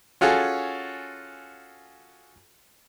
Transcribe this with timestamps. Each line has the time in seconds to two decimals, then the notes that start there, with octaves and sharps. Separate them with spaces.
0.21 C#4 F4 F#4 G#4 A4